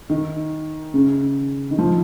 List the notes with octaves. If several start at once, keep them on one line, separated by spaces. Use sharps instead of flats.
D#3
C#3
D#3
F3